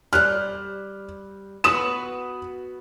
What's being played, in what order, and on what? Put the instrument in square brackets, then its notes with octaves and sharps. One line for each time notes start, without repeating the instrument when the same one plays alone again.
[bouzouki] G3 C5 [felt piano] F6 F#6
[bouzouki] B3 F#4 B4 [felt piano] D#6 E7